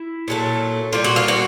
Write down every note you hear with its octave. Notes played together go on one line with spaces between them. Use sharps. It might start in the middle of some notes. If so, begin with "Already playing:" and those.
Already playing: E4
A#2 F#3 A3
A#2 G3 F4
F#4
F4
F#4